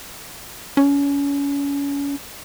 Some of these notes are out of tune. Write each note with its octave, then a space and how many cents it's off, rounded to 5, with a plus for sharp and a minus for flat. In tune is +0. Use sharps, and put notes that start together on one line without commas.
C#4 +30